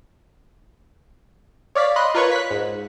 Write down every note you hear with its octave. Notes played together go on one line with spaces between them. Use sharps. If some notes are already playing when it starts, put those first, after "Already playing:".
C#5 D5 F5 B6
D#5 B5 C6 F#6
F4 A#4 B4 C#5 C#6
F#6 B6
G#2